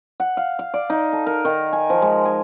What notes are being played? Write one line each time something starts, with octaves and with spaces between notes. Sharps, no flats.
F#5
F5
F5
D5
D#4
A4
A#4
D#3
G#5
F3
G#3
G#5